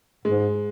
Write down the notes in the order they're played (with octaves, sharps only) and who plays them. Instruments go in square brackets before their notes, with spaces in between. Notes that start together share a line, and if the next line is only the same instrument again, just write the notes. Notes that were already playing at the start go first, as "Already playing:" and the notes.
[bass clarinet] G#2 [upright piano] G#3